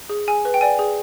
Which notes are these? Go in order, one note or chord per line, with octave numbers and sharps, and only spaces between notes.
G#4
G#4 G#5
B4
G5
D5 G#5
G#4